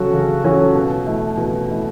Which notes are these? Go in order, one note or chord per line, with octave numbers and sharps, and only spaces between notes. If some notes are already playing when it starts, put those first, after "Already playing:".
Already playing: C#3 F#3 C#4 F#4 A4
C#3
F#3 C#4 F#4 A4
B2
A3 E4
B2
A3 E4